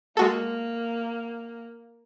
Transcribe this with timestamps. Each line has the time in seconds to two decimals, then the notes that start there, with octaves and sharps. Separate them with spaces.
0.17 G#3 A#3 F#4 A4